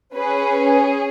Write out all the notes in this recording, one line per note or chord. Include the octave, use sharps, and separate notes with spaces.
C#4 G#4 B4